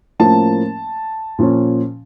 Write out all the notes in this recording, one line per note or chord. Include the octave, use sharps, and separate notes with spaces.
A2 F3 A#3 C#4 A5
A#2 F3 C#4